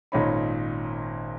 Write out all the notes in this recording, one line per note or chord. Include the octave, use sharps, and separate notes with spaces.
G#1 A#2 C#4 D#4 C#5 B5